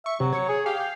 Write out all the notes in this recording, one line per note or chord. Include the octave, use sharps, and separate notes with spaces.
E5 C#6
C3 F#3
C#5
G#4
G4 F5
G5